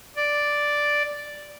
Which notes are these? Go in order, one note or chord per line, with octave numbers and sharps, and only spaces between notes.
D5